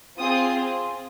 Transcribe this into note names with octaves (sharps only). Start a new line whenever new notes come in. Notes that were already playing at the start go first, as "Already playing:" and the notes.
C4 F4 G#4 D#6